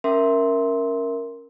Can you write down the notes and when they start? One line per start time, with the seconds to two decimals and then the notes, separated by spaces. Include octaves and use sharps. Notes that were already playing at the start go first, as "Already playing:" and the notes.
0.04 C#4 A#4 E5 C6